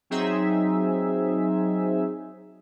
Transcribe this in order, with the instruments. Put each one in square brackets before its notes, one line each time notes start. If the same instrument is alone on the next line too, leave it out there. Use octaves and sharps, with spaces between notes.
[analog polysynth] F#3 C4 D#4 G#4 E5